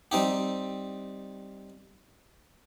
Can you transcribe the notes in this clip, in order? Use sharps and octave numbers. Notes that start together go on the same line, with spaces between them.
G3 C4 D#4 G4